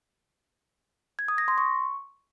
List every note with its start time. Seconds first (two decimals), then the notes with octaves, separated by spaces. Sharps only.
1.19 G#6
1.28 D#6
1.38 A#6
1.48 C6
1.58 C#6